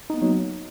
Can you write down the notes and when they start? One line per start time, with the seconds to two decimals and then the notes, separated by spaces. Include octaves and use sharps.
0.10 D#4
0.14 B3
0.18 A#3
0.22 F#3